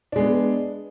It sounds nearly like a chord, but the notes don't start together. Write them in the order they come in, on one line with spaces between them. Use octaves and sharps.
D4 G#3 B3